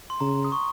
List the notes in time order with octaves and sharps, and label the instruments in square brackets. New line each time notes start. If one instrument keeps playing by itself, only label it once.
[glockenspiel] C6
[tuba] C#3 [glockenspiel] A#5
[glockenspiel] D#6
C#6